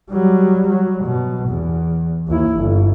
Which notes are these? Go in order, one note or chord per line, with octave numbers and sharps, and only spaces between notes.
F#3 G3
F#3
B2
E2
D#2 E4
G1